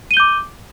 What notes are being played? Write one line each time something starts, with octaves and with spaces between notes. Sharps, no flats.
D6 G6 D#7 G7